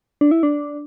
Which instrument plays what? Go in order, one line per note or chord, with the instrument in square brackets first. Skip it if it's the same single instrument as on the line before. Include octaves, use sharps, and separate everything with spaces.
[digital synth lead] D4
E4
D4